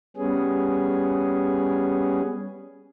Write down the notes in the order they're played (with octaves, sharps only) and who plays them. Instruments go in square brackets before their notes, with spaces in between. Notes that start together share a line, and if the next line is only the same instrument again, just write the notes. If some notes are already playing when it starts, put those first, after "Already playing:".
[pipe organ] G3 B3 C#4 G#4